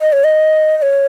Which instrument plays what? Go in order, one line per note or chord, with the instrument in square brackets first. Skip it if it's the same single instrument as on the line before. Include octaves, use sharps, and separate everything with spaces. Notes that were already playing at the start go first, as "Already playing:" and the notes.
[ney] D#5
C#5
D#5
D#5
C#5